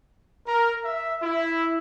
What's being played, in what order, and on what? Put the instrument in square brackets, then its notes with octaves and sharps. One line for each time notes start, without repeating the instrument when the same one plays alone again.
[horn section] A#4
E5
E4